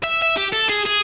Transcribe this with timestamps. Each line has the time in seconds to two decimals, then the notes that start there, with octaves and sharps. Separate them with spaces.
0.04 E5
0.22 E5
0.37 G4
0.53 A4
0.69 G#4
0.86 G#4